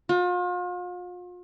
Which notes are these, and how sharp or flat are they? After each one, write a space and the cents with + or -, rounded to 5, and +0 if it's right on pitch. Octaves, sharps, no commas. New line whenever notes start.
F4 +40